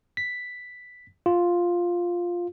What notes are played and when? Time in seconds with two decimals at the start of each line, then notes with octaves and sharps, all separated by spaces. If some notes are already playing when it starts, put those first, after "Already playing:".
0.17 B6
1.26 F4